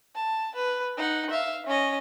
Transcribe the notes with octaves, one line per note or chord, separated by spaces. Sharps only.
A5
B4
D#4 F#5
E5 F5
C#4 D#5